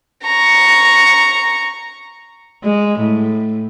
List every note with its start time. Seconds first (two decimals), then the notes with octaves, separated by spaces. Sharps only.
0.24 A#5 C#6
2.63 G#3
2.99 A2